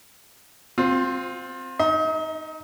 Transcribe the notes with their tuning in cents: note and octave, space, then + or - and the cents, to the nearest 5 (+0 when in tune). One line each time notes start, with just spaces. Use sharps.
C4 +0 F4 +25
D#4 +0 D#5 +40